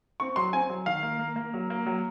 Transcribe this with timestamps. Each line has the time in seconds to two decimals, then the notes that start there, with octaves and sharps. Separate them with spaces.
0.20 C4 C#6
0.36 F#3 C6
0.53 C4 G#5
0.70 F#3
0.86 D#3 F5
1.03 A#3
1.19 A#3
1.36 A#3
1.54 F#3
1.70 A#3
1.86 F#3